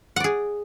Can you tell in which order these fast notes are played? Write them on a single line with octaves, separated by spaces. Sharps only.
F#5 D5 G#4